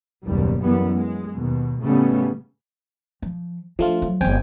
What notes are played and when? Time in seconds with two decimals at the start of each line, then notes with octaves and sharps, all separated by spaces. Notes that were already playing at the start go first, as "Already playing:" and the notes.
0.25 F#1 D#2 B2 G3
0.61 F#2 E3 G3 B3
0.95 G#3
1.35 D#2 B2
1.80 A2 C#3 G3 A3 B3 C#4
3.22 F3
3.79 F3 A3 D4 F4
4.02 F#3
4.21 D1 G1 C4 G5 G#5